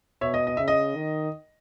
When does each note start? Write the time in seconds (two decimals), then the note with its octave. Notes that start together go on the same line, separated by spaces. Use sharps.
0.21 B2 C#5 E5
0.34 D#5
0.47 D#5
0.57 C#3 E5
0.68 D#5
0.96 D#3